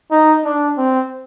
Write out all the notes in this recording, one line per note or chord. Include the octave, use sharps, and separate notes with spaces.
D#4
D4
C4